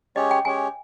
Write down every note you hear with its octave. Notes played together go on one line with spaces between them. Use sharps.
G#3 C#4 G4 C#5 D#5
G5
G#3 C#4 G4 C#5 G#5